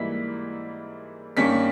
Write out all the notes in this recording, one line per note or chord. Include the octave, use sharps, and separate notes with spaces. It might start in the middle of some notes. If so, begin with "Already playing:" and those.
Already playing: G#2 E3 G3 A#3 E4 B6
G2 D#3 G3 A#3 C#4 B6